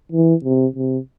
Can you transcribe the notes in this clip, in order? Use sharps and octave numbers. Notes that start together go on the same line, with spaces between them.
E3
C3
C3